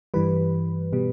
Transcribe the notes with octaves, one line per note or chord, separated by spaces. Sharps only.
G2 E3 G3 B4
B2 G3